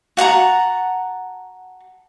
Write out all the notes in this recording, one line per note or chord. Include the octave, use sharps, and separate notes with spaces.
F#4 F#5 A5 A#5